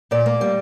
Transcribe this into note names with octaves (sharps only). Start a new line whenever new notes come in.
A#2 D5
A#3
G3